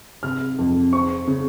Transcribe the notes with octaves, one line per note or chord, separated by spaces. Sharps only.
C3 F6
F2
C4 C#6
C#3